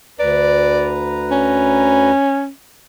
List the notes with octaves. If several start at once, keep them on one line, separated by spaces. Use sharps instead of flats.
D2 B4 D5 A#5
C#4